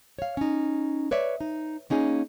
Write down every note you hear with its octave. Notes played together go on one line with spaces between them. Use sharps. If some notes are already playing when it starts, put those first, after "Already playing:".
C#5 F5
C#4 D#4
B4 C#5 D5 E5
D#4
A#3 C#4 D#4 G#4